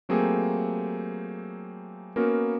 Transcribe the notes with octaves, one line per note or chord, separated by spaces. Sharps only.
F#3 A3 A#3 C4 G4 G#4
A#3 B3 C#4 F#4 A#4